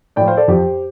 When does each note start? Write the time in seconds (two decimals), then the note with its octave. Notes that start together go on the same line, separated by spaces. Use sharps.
0.16 A2 F3 D5 G5
0.27 C5 F5
0.37 A4 D5
0.48 F2 F3 G4 C5